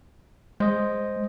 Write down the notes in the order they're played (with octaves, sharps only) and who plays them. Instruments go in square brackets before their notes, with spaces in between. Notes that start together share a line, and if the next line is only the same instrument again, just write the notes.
[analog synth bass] G#3 [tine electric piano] C5 D#5